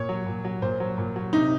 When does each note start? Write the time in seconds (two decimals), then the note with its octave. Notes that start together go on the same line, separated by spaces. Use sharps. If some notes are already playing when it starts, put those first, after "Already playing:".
Already playing: A#2 C#5
0.09 F#3
0.26 A#2
0.45 F#3
0.62 A#2 C5
0.80 F#3
0.98 A#2
1.16 F#3
1.33 C3 D#4